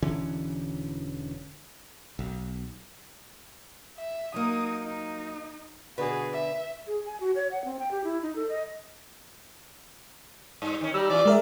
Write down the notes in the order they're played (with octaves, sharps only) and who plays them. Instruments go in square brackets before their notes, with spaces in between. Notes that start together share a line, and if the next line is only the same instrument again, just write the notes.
[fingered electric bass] E1 D3 E3 C#4
B1
[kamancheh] E5
[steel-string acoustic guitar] F#3 A#3 [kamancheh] D#4 D#6
[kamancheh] D#4
[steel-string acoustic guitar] B2 D3 B4 [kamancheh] F#4 G#4
[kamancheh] E5
[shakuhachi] G#4
G#5
F#4
C#5
F#5
C4
G5
G4
E4
D#4
A4
D#5
[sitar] G2
D#3 C#4
[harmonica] G3 [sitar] D#4 [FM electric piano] E6
[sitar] E3 C#4 F4 [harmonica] D5
[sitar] G3 [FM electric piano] G#3 A#4 E5